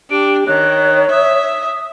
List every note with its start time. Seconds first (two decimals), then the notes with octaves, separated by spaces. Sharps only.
0.11 D4 G4 D7
0.47 D#3 C#5 F#6
1.11 E5 D#6